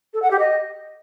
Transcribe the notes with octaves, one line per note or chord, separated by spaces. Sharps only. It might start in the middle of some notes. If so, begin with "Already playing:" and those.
A4
F#5
G4
D#5